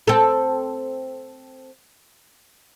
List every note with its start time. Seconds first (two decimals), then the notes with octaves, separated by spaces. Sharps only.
0.07 C4 A4